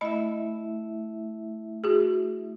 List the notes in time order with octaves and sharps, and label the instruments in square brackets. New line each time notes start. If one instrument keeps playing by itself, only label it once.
[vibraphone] A3 E4 E5 [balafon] D#5 B5
[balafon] F#4 G#4